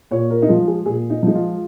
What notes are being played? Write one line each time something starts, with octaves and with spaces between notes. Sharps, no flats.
A#2 C#5
A#4
D#4
F3 G#3 F4
G#4
A#2 G#4
D#4
F3 G#3 D#4
F4